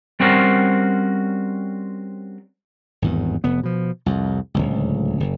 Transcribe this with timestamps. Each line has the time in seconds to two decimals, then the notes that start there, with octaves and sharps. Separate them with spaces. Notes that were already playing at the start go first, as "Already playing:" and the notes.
0.20 G3 C4 C#4 F#4 A#4 C5
3.02 G#1 E2 G2
3.44 F1 B3
3.63 B2 F3
4.06 C2 F2
4.54 D1 G#1 C#2
5.20 F#1